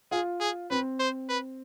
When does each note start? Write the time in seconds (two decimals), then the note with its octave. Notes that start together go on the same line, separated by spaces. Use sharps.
0.11 F4 G#4
0.41 G#4
0.71 C4 B4
1.00 C5
1.29 B4